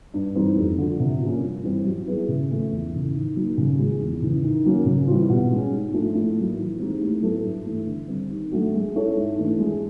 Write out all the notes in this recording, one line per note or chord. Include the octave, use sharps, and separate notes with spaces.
G2
E3 G3 C4 D#4
F2
D3 F3
C3
F3 A#3 C#4
G2
E3 G3 C4
F#3
B3 E4 G#4 B4
C#3
F3 A3 C#4
E2
C#3 E3
D#3
F#3 A#3 D#4
C#3
F3 G#3
E2
C#3 E3
D#3
F#3 A#3 C#4
C#3
E3 G3 C4 F4
B2
G#3 C#4
G#2
F3 A3 D4
A2
F#3 A#3
E3
G#3 C4 D#4 G4
A2
F#3 B3 E4 A4
G2
E3 A3
D3
G3 C4
D#3
F#3 A3 D4 F#4
G#3
C#4 E4 A4 C#5
G#2
E3 A3 D4
G#3